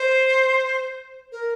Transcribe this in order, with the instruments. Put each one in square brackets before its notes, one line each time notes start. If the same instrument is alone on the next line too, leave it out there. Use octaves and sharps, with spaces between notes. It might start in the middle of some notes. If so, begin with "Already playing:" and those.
Already playing: [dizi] C5
A#4